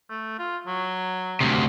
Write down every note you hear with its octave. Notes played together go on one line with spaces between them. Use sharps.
A3
F4
F#3
D2 C3